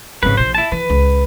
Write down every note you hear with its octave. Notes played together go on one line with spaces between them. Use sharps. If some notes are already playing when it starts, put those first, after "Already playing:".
G#1 F2 C#3 B4
A#1 A#2 C5
E4 A5
E3 B4
C#2